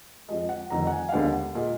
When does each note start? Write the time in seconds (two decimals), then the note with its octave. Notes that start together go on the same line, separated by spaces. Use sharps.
0.28 F2 F3 G#3 D#5
0.49 F#5
0.70 F1 F2 D#3 A#5
0.87 F#5
0.92 G#5
1.09 F5
1.12 D#2 D3 G#3 B3 D4 F#5
1.55 A#2 G#3